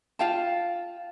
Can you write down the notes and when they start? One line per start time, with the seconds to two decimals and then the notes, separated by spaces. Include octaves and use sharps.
0.19 F4 F5 G5 A5